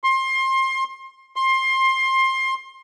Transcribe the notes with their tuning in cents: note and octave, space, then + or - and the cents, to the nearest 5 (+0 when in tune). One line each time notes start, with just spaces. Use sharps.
C6 +25
C6 +20